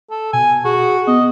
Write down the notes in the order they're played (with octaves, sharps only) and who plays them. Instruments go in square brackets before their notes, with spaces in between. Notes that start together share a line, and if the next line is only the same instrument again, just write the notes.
[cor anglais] A4
[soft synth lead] B2 [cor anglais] G#5
[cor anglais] F#4 [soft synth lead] G#4
[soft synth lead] B3 [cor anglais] D#5